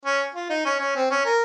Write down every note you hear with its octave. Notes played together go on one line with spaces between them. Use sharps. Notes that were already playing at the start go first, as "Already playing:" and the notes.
C#4
F4
D#4
C#4
C#4
C4
C#4
A#4